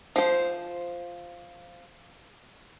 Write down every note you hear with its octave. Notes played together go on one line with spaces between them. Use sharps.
F3 C5